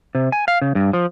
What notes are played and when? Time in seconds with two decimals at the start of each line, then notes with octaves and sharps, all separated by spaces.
0.15 C3
0.32 G#5
0.48 F5
0.62 C#3
0.75 G2
0.93 F3